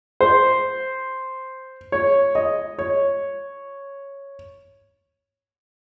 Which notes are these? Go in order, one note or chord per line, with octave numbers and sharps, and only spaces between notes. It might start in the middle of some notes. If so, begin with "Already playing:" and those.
C5
C#5
D#5
C#5